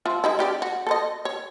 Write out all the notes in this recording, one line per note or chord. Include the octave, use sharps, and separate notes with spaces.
F3 F4 E5
G#3 D#4 E4
C#3 G4 D5
F#4
A4 B4 D#5
C#5